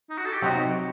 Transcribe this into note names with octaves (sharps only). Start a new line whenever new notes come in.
D#4
F#4
A4
G4
C3 F#3 C4 D#4 F#4